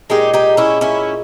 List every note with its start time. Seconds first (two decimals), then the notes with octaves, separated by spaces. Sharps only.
0.10 A#2 G#3 D#4 G4
0.34 D#4 G4
0.57 C#4 E4
0.81 C#4 E4